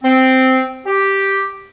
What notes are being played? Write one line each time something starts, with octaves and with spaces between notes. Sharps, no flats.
C4
G4